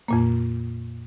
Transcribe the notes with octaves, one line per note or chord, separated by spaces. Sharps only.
F2 A#2 A#3